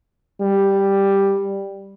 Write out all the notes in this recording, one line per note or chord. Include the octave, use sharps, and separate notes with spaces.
G3